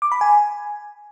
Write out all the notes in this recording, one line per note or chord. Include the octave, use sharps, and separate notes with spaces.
D6
B5
G#5